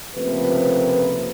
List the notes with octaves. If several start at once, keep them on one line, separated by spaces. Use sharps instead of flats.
C#2 C3 F3 A3 A#3 B4